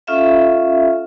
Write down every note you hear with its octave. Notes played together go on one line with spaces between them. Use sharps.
C#4 F4 A4 E5 F5